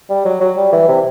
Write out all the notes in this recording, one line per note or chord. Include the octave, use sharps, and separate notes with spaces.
G3
F#3
F#3
G3
E3
C3